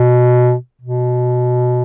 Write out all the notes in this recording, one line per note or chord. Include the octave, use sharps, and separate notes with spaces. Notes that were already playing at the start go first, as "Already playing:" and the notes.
Already playing: B2
B2